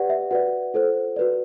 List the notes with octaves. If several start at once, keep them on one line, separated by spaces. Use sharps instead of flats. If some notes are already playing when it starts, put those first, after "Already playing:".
Already playing: G4 B4 D5 F#5
E5
F#4 B4 D5 F#5
F4 A4 C5
F#4 B4 D5